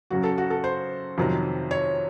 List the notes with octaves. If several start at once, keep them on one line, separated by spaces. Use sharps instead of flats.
F#2 C#3 F#3 F#4
A4
F#4
A4
C5
F2 C3 D#3 F#3
C#5